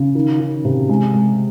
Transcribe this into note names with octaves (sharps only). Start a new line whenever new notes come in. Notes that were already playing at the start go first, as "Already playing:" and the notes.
Already playing: C#3
D#3
D#3
C3
G#3
G#3